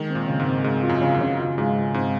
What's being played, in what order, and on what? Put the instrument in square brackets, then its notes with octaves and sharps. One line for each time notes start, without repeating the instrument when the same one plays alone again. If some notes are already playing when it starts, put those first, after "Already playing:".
Already playing: [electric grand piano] D#3 [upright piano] G#3
[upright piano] C4
[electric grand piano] A#2
[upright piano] C#3
[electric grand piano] G#2
[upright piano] C4
[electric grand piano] G#2 [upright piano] G#3
[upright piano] F4
[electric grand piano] F#2
[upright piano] C#3
[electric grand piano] F#2
[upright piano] C#3
F4
[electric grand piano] G#2 [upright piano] G#3
[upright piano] F4
[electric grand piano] G#2 [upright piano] C4